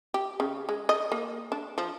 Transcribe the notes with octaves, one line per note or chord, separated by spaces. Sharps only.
G4
C#3
G#3
D#5
A#3
D4
F3